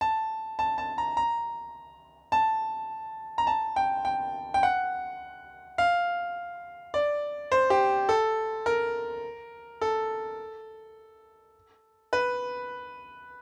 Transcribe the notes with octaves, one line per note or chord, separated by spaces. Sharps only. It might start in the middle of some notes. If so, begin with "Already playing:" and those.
A5
A5
A5
A#5
A#5
A5
A#5
A5
G5
G5
G5
F#5
F5
D5
C5
G4
A4
A#4
A4
B4